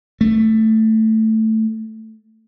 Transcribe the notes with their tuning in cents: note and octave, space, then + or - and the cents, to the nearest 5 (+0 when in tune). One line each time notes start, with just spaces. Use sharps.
A3 +5